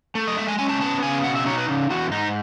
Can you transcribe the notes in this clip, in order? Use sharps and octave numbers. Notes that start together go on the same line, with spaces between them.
A3
D#5
G#3 E5
G#5
C#4 G#5
A5
B3 A5
C#3 G#5
B2 F#5
E5
D#4 C#5
B4
C#3
E2 F#4
G#2 D#4